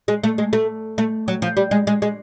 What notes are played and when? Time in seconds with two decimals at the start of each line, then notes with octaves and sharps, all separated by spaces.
0.08 G#3
0.23 A3
0.38 G#3
0.53 A3
0.98 A3
1.28 F#3
1.42 F3
1.57 G3
1.71 G#3
1.87 G#3
2.02 G#3